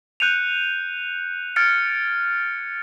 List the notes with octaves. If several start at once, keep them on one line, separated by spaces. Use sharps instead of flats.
F#6 G6 C#7 D#7 F7
F6 G#6 A6 C#7 D7